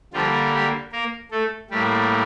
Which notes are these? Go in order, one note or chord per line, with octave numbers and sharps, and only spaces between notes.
D3 F3 G3 A#3 F4
G3 G4
A#3 A#4
A3 A4
A2 G3 A#3 G4